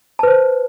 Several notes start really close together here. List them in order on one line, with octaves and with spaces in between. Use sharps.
A5 B4 C5